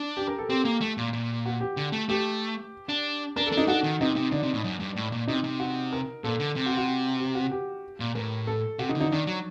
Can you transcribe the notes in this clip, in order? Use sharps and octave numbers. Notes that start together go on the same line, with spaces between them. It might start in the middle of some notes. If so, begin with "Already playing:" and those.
Already playing: D4
G4
A#4
A4
C4 G4
A#3
A3
A#2
A#2
F#4
G4
D3
A3
A3 G4
D4
D4 A#4
A4
D4
D#4
D4 F#4
D#3
C3 D#4
C3
D3 D4
C3
A2
F#2
G2
A2
A#2
C3 D#4
C3
F#4
A#4
A#2 A4
D3
C3
F#4
F#4
G4
F#4
G4
A#2
A2 A#4
A4
C3 F#4
D#4
D3
D#4
D#3 D4
F#3